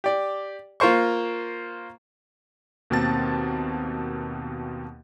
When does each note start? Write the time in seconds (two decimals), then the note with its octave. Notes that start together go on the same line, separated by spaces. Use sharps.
0.04 G4 D5
0.80 A#3 F4 A#4 C5 C#6
2.90 D#2 B2 A#3 C4 A5 A6